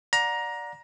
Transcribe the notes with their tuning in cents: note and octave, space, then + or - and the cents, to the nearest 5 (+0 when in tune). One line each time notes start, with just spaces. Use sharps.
D5 +0 F#5 -35 A#5 +15